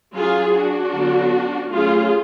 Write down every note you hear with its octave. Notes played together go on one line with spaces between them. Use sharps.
F#3 C#4 F4 G#4
D4 F#4
D3 F#3 B3
F#3 A3 C#4 F4 G#4